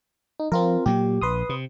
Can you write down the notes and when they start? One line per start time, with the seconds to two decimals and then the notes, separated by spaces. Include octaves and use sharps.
0.40 D#4
0.52 F3 C4 F4 A#4
0.86 A#2 F#3 A#3 G4
1.21 A#1 B4 C6 D#6
1.49 C3